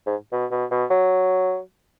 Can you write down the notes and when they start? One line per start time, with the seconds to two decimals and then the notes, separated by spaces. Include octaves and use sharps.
0.06 G#2
0.32 B2
0.51 B2
0.71 B2
0.90 F#3